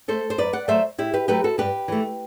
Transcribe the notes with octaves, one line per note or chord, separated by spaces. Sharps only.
A3 A4 C5
C5
F#2 B4 D5
D5 F#5
F#3 A3 C5 E5
A2 E4 G4
G4 B4
F#3 A3 G4 B4
F#4 A4
G2 G4 B4
E3 A3